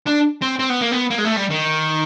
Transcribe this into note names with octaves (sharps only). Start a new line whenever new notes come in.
D4
C4
C4
B3
A#3
B3
A#3
G#3
A3
G3
D#3